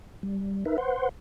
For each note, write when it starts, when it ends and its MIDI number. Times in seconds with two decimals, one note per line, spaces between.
0.23 0.64 55
0.65 0.77 63
0.65 0.77 70
0.65 0.77 71
0.65 0.77 76
0.78 1.09 71
0.78 1.09 72
0.78 1.09 78
0.78 1.09 84